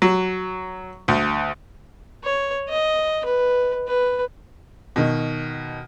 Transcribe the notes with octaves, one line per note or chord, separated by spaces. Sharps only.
F#3
D2
C#5
D#5
B4
B4
B2 D#3